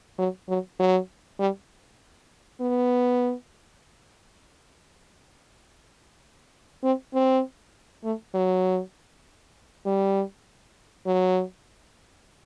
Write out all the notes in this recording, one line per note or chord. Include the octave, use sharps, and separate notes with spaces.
F#3
F#3
F#3
G3
B3
C4
C4
A3
F#3
G3
F#3